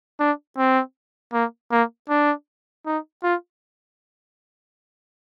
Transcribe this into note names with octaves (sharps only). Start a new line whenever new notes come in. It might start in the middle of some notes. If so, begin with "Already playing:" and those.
D4
C4
A#3
A#3
D4
D#4
F4